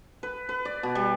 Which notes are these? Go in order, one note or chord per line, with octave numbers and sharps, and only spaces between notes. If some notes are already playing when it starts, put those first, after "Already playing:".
B4
B4
D5
B2
G3